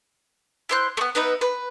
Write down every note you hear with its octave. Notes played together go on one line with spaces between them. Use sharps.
E4 C5 F#6
A3 B3
B3 D#4 B4 E5
B4